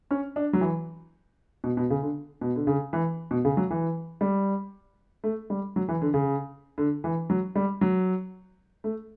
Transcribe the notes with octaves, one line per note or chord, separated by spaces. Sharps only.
C#4
D4
F#3
E3
B2
B2
C#3
D3
B2
D3
C#3
E3
B2
C#3
F#3
E3
G3
A3
G3
F#3
E3
D3
C#3
D3
E3
F#3
G3
F#3
A3